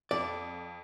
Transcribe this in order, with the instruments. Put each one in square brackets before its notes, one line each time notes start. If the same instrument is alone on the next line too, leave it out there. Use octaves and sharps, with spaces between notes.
[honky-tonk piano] F2 [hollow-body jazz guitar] D5